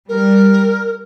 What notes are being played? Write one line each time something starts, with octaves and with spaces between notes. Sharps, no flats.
G3 A#4